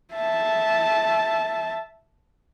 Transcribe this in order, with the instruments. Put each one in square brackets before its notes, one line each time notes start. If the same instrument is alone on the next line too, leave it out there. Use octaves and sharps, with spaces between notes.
[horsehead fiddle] E5 A5